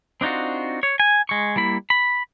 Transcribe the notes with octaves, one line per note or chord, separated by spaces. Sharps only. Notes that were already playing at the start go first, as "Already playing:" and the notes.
C4 D4 D#4 F4 F#4
C#5
G#5
G#3 C#6
G3 A#3 E4 B5
B5